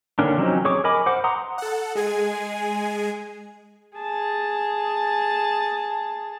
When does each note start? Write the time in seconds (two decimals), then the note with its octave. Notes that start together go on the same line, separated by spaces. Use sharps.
0.19 D3 D#3 A#3 C#4 D4
0.38 F3 F#3 C4 C#4 D#4
0.65 G#4 C#5 C#6 D6
0.84 A#4 D#5 G#5 B5 D6
1.06 C5 F#5 D6
1.24 F#5 A#5 C6 D#6
1.58 A4 F#5
1.95 G#3 G#4 G#5
3.98 G#4 A5